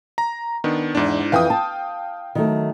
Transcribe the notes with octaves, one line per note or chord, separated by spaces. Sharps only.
A#5
D#3 B3 D4
E2 G#2 D4
F2 E3 F5 G5 G#5 D#6
A5
D#3 F#3 A3